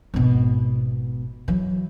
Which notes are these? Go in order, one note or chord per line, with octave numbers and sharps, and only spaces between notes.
G#1 B2
E3 F#3